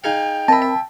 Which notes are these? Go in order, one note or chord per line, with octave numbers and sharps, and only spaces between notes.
D#4 G#4 F5 G5
C4 A#4 D#5 E5 A5 B5
E5